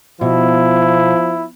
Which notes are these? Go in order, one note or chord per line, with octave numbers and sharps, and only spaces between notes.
B2 F3 E4